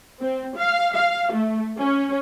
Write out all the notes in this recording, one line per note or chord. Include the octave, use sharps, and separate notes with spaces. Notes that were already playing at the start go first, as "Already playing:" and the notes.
C4
F5
F5
A3
C#4